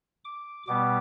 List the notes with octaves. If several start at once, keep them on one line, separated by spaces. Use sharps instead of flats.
D6
B2 G3 B3 D6